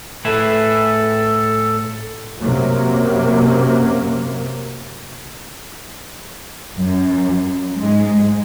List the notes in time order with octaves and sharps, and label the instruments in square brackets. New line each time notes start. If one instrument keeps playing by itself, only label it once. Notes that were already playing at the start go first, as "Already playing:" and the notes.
[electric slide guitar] A2 [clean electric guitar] G#4 B4 E5 [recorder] A4
[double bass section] F#2 C3 F#3 A#3
[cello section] F#2
G#2 G#3